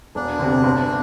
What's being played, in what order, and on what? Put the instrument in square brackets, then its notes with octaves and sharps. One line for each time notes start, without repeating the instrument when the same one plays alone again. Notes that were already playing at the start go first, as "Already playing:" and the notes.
[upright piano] E1 [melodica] D4
[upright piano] D2 C3
G1